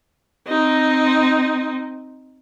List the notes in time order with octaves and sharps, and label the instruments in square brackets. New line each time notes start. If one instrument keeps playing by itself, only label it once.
[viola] C4 D#4